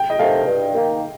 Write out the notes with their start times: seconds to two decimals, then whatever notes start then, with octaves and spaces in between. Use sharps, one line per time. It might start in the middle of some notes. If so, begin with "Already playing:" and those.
Already playing: G5
0.10 D#5
0.19 C3 D#3 A3 F5
0.46 G2
0.74 D#3 A#3